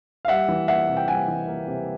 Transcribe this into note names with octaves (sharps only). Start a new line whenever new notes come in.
F5
G3 E5 F#5
E3
A#3 E5 F#5
C3
G5
G3 F#5 G#5
E3
A#3
C3